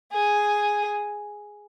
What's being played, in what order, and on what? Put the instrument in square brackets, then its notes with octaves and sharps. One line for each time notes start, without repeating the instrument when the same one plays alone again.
[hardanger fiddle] G#4